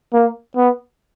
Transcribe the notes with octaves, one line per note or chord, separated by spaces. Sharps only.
A#3
B3